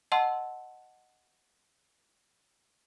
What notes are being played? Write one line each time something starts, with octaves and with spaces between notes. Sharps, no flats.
D#5 F#5 A5 C6 E6